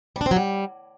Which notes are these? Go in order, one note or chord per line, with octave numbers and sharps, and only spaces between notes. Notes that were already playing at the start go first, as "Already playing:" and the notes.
G3
D4
C4
F#3
G3